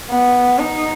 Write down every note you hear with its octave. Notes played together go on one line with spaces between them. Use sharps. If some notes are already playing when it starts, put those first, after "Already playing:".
B3
D#4